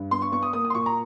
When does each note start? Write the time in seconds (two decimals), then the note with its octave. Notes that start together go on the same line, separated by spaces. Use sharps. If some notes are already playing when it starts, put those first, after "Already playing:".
Already playing: G2
0.11 B3 C6
0.22 C#6
0.32 B3 C#6
0.43 D#6
0.53 A#3 D#6
0.65 D#6
0.70 C6
0.75 A#2 C#6
0.86 A#5